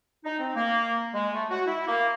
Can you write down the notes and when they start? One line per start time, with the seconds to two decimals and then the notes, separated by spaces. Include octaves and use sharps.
0.24 D#4
0.39 C4
0.55 A#3
1.14 G#3
1.34 A3
1.50 F#4
1.66 E4
1.87 A#3